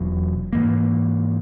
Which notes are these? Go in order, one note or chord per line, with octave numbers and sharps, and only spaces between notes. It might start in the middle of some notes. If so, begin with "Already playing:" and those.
Already playing: E1 E2 B2 F#3
G#2 E3 A#3